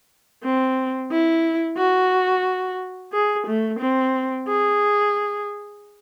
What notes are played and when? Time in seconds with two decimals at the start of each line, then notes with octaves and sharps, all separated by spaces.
0.44 C4
1.11 E4
1.78 F#4
3.13 G#4
3.47 A3
3.80 C4
4.48 G#4